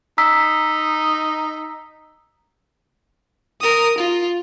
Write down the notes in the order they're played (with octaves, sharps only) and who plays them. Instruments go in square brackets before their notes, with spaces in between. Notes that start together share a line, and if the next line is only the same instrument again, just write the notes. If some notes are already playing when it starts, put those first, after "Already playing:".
[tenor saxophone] D#4 [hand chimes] A#5 E6 B6
[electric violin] A#4 D#6
F4